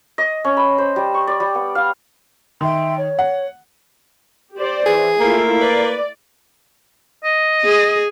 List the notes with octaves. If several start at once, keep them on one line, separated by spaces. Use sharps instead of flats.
D#5
C#4
B5
C5
G3
C#6
D5
G3
B3
F5
D#3 E5 G5 C6
C#5
F#5
G4 C5 D5
E3 G#4
A3 A#3 E4 F4
B4 D5
D#5
G#4